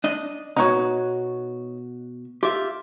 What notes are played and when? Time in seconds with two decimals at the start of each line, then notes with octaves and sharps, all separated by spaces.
0.04 D4 D#5
0.56 B2 B3 D#4 F#4 C#5
2.43 F4 G4 E5